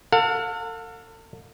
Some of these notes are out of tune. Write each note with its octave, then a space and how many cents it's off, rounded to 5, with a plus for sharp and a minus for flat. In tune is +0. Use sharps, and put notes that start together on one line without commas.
A4 +40 F5 +45